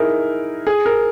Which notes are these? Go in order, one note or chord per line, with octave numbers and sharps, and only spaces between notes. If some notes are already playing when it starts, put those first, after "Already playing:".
Already playing: D#4 E4 G#4 A#4
G#4
A#4